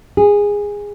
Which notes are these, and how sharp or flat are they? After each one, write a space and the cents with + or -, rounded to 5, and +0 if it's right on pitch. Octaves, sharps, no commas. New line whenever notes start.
G#4 -15